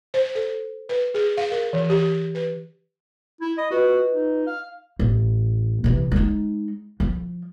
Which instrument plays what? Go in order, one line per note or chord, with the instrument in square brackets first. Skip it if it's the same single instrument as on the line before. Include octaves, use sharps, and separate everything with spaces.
[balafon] C5
A4
B4
G#4
F5
A#4
E3
G4
B4
[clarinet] E4
[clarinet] D#5 [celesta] B5
[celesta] F4 B4 D#5 [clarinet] F#4
[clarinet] D#4
F5
[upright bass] A1
C3 E3
G#3 D#4
F3